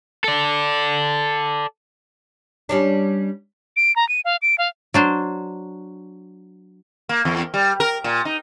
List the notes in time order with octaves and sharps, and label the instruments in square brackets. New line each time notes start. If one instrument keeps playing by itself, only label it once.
[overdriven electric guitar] A4 D5
[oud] G3 C#4 D4
[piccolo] D7
A#5
D#7
F5
D7
F5
[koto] F#3 D4 C5
[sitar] A#3
E2
G3
A#4
A#2
D#4